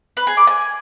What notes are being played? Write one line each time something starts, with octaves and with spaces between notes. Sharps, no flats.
B4
G#4
D6
G#5